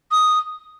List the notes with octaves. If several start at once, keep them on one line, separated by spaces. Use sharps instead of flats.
D#6